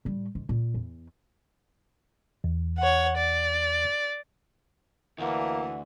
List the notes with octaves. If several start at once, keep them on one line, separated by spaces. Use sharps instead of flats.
A2 G3
G#2
A#2
E2
E2
C#5 F#5
D5
D2 E3 A#3 F#5